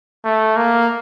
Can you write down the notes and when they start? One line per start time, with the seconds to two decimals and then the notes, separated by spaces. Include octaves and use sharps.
0.24 A3
0.57 A#3